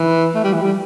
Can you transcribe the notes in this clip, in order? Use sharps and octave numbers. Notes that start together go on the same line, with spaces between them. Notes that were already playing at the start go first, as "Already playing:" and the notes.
Already playing: E3
A3
G3
E3
G3